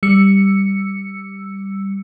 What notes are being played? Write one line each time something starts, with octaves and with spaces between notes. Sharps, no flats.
G3 E6 C#7